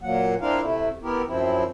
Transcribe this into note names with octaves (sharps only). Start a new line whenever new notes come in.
A#2 F#3 A#3 F#5
C4 D4 E4 F4 A#4 F5
C3 A3 E4
B3 E4 G4 A#4
F#2 F3 C4 E4